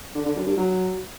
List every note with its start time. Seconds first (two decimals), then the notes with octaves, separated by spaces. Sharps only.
0.15 D3
0.25 D3
0.36 F#2
0.47 G2
0.57 F#3